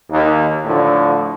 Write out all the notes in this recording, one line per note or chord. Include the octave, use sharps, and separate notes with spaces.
D#2
A2 D3 F3